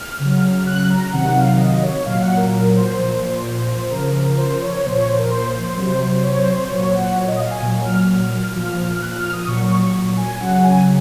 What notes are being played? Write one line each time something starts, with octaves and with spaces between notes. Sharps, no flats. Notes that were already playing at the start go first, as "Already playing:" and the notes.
Already playing: F6
C#3 F#3
F#6
A#5
C3 D#3 F#3 F#5
F5
D#5
C#5
A#2 F#3 F5
F#5
A#4
A#4
C5
A#2 F3
C#3 F3 A#4
C5
C#5
A#2 F3 C5
C#5
C5
A#4
C5
C3 F#3
C#5
C5
C#5
C5
A#2 F#3 C#5
F#5
C#5
D#5
F5
G#5
A#2 F#3
F6
A#2 F3
F#6
F6
D#6
A#2 F#3 C#6
C#6
C#6
G#5
C#3 F#3 F#5
G#5